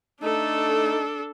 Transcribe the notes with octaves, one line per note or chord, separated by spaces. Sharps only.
A3 D4 D#4 A4